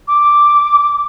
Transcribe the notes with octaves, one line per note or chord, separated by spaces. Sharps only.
D6